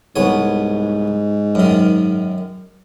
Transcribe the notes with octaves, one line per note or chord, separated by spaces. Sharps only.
C2 G#2 B3 C#5
F#2 D#3